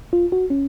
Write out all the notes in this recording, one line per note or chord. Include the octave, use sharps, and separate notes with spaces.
F4
F#4
C#4